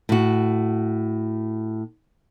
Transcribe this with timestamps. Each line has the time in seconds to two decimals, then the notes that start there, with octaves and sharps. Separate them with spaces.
0.09 A2 F#4